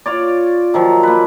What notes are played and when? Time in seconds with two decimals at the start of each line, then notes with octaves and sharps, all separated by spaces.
0.06 F4 C#5 D5
0.74 D#3 F3 F#3
1.03 A#3 B4